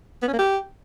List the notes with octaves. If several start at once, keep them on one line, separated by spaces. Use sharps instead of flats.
B3
C#4
A#3
G4